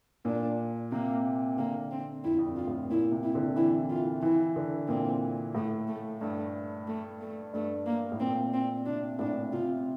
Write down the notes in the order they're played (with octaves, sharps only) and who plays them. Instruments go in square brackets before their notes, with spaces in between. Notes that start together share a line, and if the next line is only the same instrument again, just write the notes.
[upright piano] A#2 [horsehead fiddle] D4
[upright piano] C3 [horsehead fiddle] A#3
[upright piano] D3 [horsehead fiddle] A#3
[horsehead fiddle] C4
[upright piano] F2 [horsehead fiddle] E4
[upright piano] F2
G2
[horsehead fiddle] F4
[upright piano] A2
[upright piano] A#2 [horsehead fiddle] E4
[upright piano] C3
[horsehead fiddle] E4
[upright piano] D3
[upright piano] E3 [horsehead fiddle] E4
[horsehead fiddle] F4
[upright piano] E3 [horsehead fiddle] E4
[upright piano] D3
[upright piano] A#2 [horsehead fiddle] C4
[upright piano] A2 [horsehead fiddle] A3
[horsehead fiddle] A3
[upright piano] G2 [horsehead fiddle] A3
[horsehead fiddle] A3
A3
[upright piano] G2 [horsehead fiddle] A3
[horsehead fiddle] A#3
[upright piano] A2
[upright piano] A#2 [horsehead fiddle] C4
[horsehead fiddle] C4
[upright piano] C3 [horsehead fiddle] D4
[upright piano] A2 [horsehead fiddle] D4
[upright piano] C3 [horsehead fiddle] F4